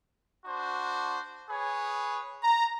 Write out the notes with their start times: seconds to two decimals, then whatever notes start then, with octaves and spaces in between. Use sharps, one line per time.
0.45 D4 F#4 C5
1.49 G#4 B4 C#5
2.42 A#5